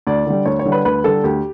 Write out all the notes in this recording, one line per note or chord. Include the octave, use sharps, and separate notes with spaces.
D2 D5
D3 G3
D2 C#5
C#5
D3 G3
B4
D2 B4
D3 G3 A4
D2 G4